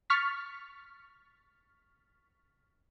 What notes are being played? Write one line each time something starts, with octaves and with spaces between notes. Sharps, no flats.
C#6 F6 A6 B6